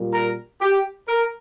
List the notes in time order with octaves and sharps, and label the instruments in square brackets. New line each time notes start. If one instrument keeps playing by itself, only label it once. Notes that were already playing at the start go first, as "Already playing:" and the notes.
Already playing: [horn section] A#2 G3
A#4
G4
A#4